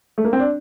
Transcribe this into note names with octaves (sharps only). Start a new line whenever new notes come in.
A3
A#3
C4
D4